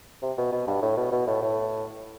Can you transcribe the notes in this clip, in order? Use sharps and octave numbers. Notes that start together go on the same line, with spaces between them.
C3
B2
B2
G2
A2
B2
B2
A2
A2